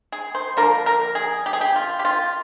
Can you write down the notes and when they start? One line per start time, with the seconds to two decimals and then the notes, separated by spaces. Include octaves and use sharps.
0.12 G#4
0.35 C5
0.57 D3 F3 A#3 A#4
0.86 A#4
1.15 G#4
1.46 G4
1.53 G#4
1.61 G4
1.76 F4
1.99 G4
2.05 F4